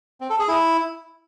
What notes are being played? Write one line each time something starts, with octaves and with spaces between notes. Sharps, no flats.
C4
A4
G#4
E4